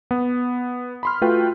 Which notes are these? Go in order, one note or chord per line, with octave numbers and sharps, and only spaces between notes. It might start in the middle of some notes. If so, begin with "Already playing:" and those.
B3
B5 C6 F6
A3 F4 F#4 B4 G5